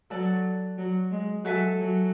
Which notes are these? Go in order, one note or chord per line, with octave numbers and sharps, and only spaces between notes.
F#3 F#4 A4 D5 A5
F#3
G#3
F#3 F#4 A4 E5 G#5
F#3